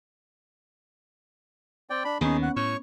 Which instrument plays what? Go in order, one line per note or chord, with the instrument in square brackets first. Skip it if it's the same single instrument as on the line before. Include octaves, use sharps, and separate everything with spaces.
[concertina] C4 D5 G5
D4 B5
[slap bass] D#2 D#3 [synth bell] B3 C#4 [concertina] D#4 G#4
[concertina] F#5
[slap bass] A2 [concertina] C#5 C#6